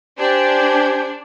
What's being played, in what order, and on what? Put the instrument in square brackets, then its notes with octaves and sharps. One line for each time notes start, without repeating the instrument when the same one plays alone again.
[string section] D4 [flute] G4 [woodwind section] C5 G#5